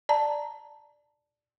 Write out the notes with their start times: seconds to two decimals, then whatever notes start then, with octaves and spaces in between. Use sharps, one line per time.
0.09 D5 A5 A#5